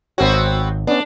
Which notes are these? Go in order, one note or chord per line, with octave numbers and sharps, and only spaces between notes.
G#1 B3 C4 F#4 A#4 C#5
B3 C#4 D4